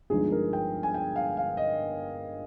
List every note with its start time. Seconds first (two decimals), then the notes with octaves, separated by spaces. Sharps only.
0.10 G1 G2 F3 G#3 D#4 G#4
0.32 A#4
0.53 G5
0.83 G#5
0.94 G5
1.16 F5
1.37 F5
1.57 D#5